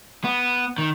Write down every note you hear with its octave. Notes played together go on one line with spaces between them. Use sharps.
B3
D#3